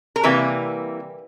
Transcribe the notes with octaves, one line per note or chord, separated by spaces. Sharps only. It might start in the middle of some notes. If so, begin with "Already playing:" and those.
A#4
C3 E3 G3 A#3 B4